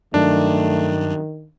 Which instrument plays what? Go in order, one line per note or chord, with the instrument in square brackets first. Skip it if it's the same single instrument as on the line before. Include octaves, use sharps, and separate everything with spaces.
[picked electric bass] G2 F#3 [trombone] D#3 [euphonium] A3 [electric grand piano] D4